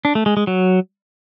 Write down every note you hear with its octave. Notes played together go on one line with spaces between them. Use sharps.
D4
A3
G#3
G#3
F#3